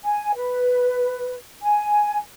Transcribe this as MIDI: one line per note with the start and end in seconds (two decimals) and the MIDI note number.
0.04 0.32 80
0.36 1.34 71
1.62 2.19 80